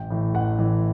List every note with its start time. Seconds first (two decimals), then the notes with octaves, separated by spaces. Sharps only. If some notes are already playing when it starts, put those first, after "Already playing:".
Already playing: A1 G5
0.10 A2 E3
0.34 A1 F#5
0.59 A2 E3